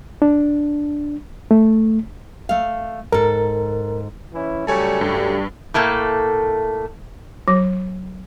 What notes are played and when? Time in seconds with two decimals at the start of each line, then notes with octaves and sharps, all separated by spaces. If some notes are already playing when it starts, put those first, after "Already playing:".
0.22 D4
1.51 A3
2.49 A3 F5
3.12 G#2 A4 A#4
4.33 E3 C#4 E4
4.67 C#3 F#3 G3 A3 C#5 G#5 A5
5.01 G2 G3
5.74 A2 A3 A#3 A4 A#5
7.48 F#3